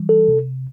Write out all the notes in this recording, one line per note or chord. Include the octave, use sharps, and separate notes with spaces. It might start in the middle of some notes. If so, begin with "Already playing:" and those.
Already playing: E3 G3
A4
C3